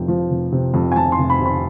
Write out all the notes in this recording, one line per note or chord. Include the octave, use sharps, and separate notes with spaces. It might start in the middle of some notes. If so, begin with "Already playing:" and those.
Already playing: F1 F2 C3 G5
F3
F1
C3
F2
G#5
F3 A5
C6
F1
B5
C3
B5